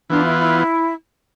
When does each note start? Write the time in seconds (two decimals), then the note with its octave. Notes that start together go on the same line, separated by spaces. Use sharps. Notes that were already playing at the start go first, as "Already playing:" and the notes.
0.10 E3 B3 D4 F4
0.24 E4
0.39 E4